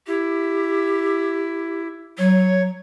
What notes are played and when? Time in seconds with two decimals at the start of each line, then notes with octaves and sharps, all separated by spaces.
0.08 E4 G4
2.18 F#3 C#5